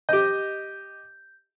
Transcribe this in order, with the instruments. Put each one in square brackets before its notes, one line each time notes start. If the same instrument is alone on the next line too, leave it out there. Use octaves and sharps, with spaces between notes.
[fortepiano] G4 D#5 [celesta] G6